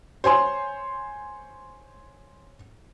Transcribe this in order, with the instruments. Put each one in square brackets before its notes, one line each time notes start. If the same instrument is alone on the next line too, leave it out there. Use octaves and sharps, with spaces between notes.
[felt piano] C5 C#5 G#5 C6